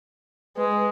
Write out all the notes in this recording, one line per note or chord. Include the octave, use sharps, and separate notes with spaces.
G#3 B4